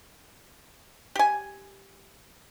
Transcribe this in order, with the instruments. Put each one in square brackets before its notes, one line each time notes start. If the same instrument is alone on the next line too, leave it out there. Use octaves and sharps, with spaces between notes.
[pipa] G4 G#5